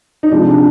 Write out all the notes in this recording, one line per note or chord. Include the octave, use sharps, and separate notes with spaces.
D#4
C3 F3 G#3 D4
D4